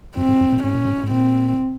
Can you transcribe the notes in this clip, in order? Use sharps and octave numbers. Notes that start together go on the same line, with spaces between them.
F#2 C4
G#2
F#2
A#2
G#2 C#4
A#2
G#2
G#2
A#2 C4